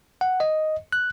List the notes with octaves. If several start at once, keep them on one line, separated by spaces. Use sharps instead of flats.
F#5
D#5
F#6